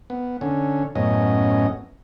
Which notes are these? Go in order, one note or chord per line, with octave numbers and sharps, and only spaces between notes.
B3
D3 C#4
F#2 A2 B3 C#4 D#5